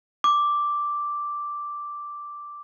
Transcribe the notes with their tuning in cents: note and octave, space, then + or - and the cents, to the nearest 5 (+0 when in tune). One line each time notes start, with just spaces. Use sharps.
D6 +0